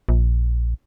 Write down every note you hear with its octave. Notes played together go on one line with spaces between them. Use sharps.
A#1